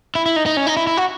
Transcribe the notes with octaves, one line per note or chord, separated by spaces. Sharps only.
E4
E4
D#4
D#4
C#4
D#4
E4
E4
F#4